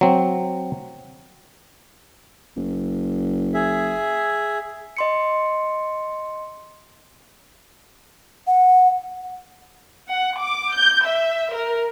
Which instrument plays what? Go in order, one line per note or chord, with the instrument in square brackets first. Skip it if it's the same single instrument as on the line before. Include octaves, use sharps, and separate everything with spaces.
[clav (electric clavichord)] F#3 C4
[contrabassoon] F#1
[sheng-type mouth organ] G#4 E5
[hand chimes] D#5 C6 C#7
[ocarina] F#5
[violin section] F#5
D6
G6
E5
A#4